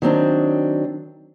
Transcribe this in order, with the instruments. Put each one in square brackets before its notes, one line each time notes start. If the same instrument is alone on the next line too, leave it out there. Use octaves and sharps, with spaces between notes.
[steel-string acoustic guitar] D#3 F#3 C4 D4